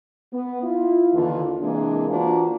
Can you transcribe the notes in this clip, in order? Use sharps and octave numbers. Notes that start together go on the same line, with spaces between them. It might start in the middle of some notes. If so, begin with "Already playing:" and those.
B3
E4 F4
D#2 D3 E3 F4
C3 E3 G#3 A#3 D4
E3 A#3 D4 F4 F#4 C5